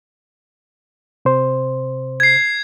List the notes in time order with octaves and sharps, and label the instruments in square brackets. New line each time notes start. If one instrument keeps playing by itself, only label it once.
[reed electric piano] C3 C5
[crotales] G#6 C7